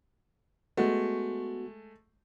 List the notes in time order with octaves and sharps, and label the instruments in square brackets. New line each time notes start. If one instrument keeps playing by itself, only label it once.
[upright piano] G#3 A3 [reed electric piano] B3 F#4